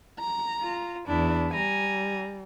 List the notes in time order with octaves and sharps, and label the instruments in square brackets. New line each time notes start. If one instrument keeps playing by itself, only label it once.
[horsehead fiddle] A#5
[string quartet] F4
[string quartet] E2 E4 [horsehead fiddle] D4
[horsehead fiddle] G3 [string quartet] G#5 A#5